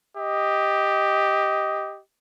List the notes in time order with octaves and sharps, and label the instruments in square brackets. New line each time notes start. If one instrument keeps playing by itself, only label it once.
[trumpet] G4 [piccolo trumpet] D#5